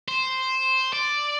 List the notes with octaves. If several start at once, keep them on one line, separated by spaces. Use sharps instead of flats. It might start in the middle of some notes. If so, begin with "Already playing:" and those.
C5
D5